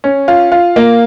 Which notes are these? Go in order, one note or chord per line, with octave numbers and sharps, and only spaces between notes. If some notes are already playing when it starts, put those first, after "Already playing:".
C#4
F4
F4
A#3